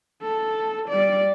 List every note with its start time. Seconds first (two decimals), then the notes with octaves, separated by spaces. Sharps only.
0.23 A4
0.89 G3 D5